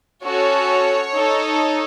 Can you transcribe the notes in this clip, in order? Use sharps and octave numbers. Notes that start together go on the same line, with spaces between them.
C#4 F#4 A4 C#5
D#4 A4